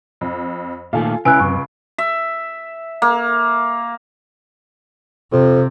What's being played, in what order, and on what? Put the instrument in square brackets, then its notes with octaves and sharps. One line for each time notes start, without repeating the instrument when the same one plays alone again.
[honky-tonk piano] F2
[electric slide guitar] A#2 D#3 A3 [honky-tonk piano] F4 A4 G#5
[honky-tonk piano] C#2 B4 D7 [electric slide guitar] C#4 E4 [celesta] G#5 E6 F#6
[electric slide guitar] F#2 A2 C3 [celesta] C#6
[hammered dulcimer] E5
A#3
[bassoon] F2 [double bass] C3